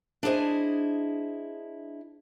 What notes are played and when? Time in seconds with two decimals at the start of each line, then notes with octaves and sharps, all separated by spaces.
0.23 D4 E4 G#4 C5 D#5